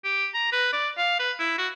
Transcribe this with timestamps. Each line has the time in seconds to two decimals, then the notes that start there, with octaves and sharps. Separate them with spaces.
0.04 G4
0.34 A#5
0.52 B4
0.73 D5
0.98 F5
1.19 B4
1.40 E4
1.58 F#4